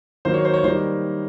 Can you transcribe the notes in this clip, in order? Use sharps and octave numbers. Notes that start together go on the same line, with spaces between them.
D#3 F#3 A#3 C5
C#5
C5
C#5
D#3 G3 A#3 C5